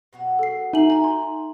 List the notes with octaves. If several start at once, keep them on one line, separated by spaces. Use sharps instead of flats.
B2 F#3 F#4
A4 C7
D#4 E5 G#5 F#7
G#5 A#5
C6